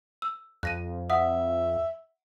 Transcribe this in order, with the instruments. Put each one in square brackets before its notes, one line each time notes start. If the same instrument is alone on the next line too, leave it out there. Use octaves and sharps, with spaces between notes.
[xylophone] E6
[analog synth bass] F2 [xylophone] F#6 A#6 D#7
[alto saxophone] E5 [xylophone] F#5 D#6